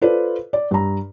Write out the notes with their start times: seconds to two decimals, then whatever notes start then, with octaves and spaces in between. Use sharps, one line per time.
0.02 F4 A4 B4 C5 D5
0.53 D5
0.71 G2 A#5